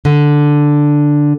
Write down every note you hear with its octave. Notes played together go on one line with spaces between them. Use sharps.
D3